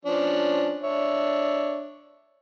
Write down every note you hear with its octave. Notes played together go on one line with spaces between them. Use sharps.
F3 C#4 D4
D4 C#5 E5